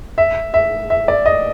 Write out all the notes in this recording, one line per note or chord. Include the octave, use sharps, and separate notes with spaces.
E5
E5
E5
D5
D#5